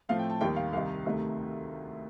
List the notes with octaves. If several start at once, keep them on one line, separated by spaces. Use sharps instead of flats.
A2 F3 A3 C4 F5
G5
A5
D#2 D#3 G3 A#3 G5
F5
C2 C3 D#3 F5
D2 C3 D#3 A3